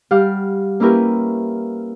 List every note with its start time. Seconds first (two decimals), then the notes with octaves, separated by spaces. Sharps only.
0.11 G3 G4 F5 F#5
0.80 A#3 C#4 E4 G4 A#4 B4